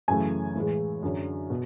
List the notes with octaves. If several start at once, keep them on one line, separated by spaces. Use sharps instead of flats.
F#2 C#3 E3 A3 G#5
A2 E3 G#3
F#2 D3 F#3
B2